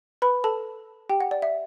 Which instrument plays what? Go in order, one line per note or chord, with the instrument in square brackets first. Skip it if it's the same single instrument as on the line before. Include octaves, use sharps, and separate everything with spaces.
[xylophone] B4 B5
A4 A5
G4 G5
F#5
D5
E5